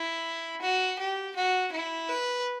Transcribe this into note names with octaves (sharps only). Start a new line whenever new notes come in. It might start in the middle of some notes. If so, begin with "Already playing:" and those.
Already playing: E4
F#4
G4
F#4
E4
B4